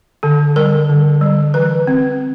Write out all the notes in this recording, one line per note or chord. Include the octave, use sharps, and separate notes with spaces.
D3 A4
G3 A#4
D3
G3
E3 B4
C4